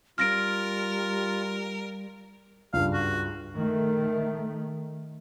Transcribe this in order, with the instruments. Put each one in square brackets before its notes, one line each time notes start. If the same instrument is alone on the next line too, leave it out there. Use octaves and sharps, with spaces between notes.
[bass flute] G3 [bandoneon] F4 [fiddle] A#4 [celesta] F6 A#6 D7
[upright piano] C#2 G2 [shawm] F5
[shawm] F#4
[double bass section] D#3 A3